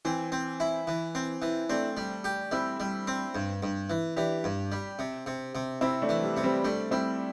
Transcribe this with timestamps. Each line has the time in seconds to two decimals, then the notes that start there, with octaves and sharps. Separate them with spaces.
0.05 E3 C4
0.32 C4
0.60 E4
0.87 E3
1.15 C4
1.42 E3
1.70 A3 C4 D4
1.97 G3
2.24 G4
2.52 G3 C4 E4
2.80 G3
3.07 C4
3.35 G2
3.63 G2
3.90 E3
4.16 E3 D4 G4
4.44 G2
4.72 G3
4.99 C3
5.26 C3
5.55 C3
5.81 C3 C4 E4
6.02 A3 D4
6.09 E3
6.23 G3
6.37 C3
6.43 G3 C4
6.64 G3 A3 D4
6.91 G3 C4 E4